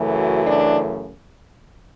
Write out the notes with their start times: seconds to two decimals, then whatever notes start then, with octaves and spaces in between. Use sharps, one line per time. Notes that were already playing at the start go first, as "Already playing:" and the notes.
Already playing: F#2 C#3 E3 A3
0.14 F#4
0.46 D4